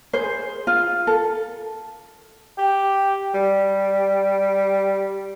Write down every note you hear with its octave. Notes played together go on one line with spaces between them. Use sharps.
G#4 C5
F4
A4
G4
G3